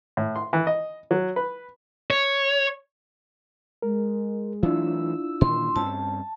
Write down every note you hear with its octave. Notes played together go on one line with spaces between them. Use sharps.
A2
C6
E3
D#5
F#3
B4
C#5
G#3 A#4
E3 F#3 A3 D4 E4 F4 E6
A#2 D#3 E3 C6
G2 C4 C#4 A5